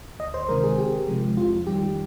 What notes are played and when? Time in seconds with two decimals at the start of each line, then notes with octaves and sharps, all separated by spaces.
0.19 D2 D#5
0.34 C5
0.49 C3 D#3 G#3 A#4
0.63 G#4
0.78 C2 G4
1.08 C3 F3 G#3
1.37 F2 F4
1.67 D#3 G3 G4